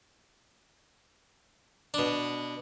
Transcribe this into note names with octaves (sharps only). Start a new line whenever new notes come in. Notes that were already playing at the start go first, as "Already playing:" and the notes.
B2 D4